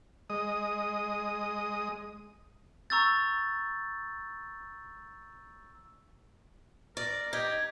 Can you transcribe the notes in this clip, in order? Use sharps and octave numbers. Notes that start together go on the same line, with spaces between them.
G#3 D#5 D#6
A#5 C#6 E6 G6 A6
A#4 D5
D#4 G4 G#6